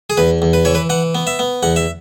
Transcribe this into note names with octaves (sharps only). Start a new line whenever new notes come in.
G#4
E2 B4
E2
B4
E3 C#5
B4
E3 F#5
B3
E5
B3
E2 F#5
E5